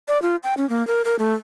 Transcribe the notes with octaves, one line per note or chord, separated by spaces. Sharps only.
D5
F4
G5
C#4
A#3
A#4
A#4
A3